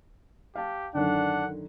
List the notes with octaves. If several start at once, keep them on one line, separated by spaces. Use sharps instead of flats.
G4 F5 A5
F#2 D3 D#3 D4 F#5